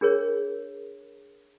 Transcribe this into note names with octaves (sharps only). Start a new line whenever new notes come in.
D4 G#4 A#4 C#5